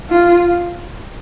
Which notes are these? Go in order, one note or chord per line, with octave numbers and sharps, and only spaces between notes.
F4